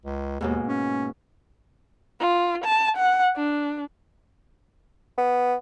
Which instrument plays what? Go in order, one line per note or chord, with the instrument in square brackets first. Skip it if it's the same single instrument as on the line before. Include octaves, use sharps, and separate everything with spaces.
[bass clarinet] C#2
[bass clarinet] D#2 [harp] G#2 B2 A#3
[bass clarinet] C#4
[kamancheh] F4
A5
F#5
D4
[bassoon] B3